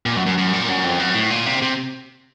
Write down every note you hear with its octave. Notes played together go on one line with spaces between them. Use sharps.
A#2
F#2
F#2
F#2
A#2
F#2
F2
F#2
A2
A#2
C3
C3